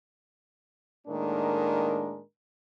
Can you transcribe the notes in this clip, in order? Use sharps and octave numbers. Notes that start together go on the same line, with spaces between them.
A2 D#3 G#3 A#3 D4 A#4